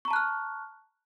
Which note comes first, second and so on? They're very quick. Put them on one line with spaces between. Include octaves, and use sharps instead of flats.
C#6 A#5 A5 F#6 F6